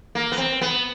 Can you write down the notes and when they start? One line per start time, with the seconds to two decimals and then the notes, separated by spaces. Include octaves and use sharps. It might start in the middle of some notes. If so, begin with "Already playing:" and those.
0.15 A#3
0.32 B3
0.38 C4
0.61 B3